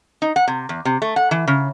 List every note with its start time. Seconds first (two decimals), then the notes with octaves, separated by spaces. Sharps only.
0.22 D#4
0.36 F#5
0.48 C3
0.69 E2
0.85 C3
1.02 A3
1.16 F#5
1.31 E3
1.47 C#3